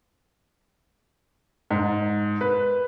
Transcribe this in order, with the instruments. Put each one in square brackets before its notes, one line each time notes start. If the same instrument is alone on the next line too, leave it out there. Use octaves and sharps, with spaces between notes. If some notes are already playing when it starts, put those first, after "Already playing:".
[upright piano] G#2
B4